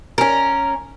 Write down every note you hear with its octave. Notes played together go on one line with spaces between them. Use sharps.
C#4 A#4